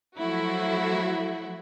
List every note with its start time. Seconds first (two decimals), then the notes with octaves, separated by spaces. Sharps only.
0.18 F3 F#3 A3 E4 F#4